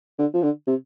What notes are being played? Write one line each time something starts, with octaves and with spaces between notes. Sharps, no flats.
D3
F3
D3
C3